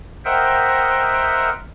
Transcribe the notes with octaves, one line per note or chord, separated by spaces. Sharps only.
A#4 C5 D#5 E5 F#5 G5